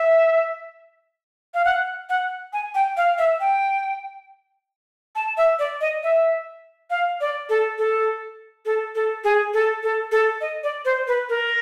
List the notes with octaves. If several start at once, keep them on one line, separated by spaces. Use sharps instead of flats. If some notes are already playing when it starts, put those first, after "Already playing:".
Already playing: E5
F5
F#5
F#5
G#5
G5
F5
E5
G5
A5
E5
D5
D#5
E5
F5
D5
A4
A4
A4
A4
G#4
A4
A4
A4
D#5
D5
C5
B4
A#4